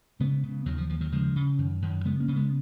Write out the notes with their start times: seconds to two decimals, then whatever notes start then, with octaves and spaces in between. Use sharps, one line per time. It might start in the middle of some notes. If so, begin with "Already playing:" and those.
0.20 C#3 G#3 B3
0.43 C#3
0.66 D#2 D#3 F#3
0.78 F3
0.89 D#2 F3
1.01 D#3 F#3
1.12 C#3 F3 G#3
1.36 C#3
1.58 F#2 D#3
1.82 F#2 D#3
2.05 C#3 G#3 B3
2.20 A#3 C#4
2.28 C#3
2.36 G#3 B3